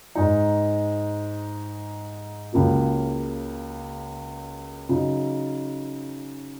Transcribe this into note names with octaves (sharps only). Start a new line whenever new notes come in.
G#2 G#3 D#4
C#2 C#3 A#3 F#4
C#3 F#3 D#4